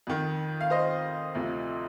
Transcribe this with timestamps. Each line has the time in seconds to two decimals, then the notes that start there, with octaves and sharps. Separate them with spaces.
0.07 F2 D#3
0.61 F5
0.70 C5 D#5
1.35 D2 C3 F3